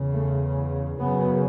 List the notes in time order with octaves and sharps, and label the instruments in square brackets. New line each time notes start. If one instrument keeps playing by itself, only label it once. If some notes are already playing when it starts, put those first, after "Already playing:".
Already playing: [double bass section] E2 C#3
A3
F#2 C#3 B3